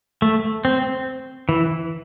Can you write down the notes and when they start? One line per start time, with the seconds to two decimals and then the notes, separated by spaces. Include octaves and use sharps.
0.22 A3
0.65 C4
1.49 E3